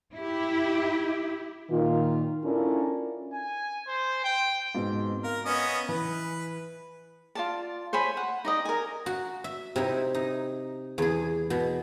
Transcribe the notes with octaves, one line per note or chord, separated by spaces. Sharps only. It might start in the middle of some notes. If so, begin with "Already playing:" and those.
E4 G4
A#2 D#3 F4
C#4 D4 E4 F4 A4 A#4
G#5
C5
G5
G#2 B2 C4
A#4 F5
B3 C#4 D#5
E3 B4
F4 D5 A5
C5 C#5 G#5 B5
F#5
D#4 D5 D#5
A#4 G#5
F#4
E5
C3 D#4 E4
D#4
E2 G#4
B2